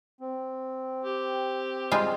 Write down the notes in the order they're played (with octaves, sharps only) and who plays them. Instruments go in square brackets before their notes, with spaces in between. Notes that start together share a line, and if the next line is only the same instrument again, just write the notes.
[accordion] C4
[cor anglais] G4
[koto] G3 G#3 F4